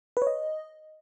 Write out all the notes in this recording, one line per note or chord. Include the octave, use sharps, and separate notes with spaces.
B4
C#5
D#5